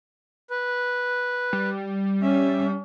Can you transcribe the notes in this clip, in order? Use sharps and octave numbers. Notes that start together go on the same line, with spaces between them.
B4
G3
C#4 E5